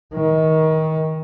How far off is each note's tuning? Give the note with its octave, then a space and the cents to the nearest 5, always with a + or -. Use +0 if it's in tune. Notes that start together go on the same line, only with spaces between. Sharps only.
D#3 +25